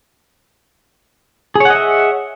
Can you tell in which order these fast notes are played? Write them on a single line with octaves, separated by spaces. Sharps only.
G#4 C#5 F#5 D#5 E5